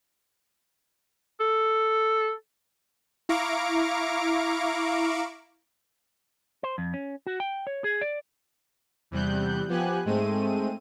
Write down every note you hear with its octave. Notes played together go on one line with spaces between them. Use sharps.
A4
E4 F5 A#5 C#6 D6 D7
C5
F2
C#4
F#4
G5
C#5
G#4
D5
E2 C3 G3 F#6 G6
F3 B3 G4 G#5 F#6
G#2 G#3 A3 C4 D#7